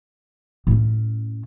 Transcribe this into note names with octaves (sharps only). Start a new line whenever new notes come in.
A2 C#4